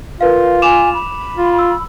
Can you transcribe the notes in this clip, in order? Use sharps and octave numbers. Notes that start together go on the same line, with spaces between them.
F4 A#4 B4 F5
G#5 D6 E7 F7
B5
F4
E6